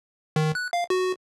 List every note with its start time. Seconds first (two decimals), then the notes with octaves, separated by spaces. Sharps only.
0.36 D#3
0.55 F#6
0.73 F5
0.90 F#4